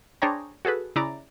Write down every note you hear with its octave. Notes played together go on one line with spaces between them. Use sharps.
D4 G#4 C5 C#5 G5 A#5
F#4 G#4 A4 B4
C#3 E4 D5 A#5